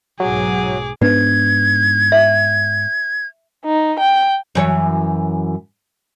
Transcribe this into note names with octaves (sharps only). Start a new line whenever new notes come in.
B1 G#2 F#3 G#4 D6
G#2 B3 D4 B4 G#6
E5
D#4
G5
F#2 E3 C#5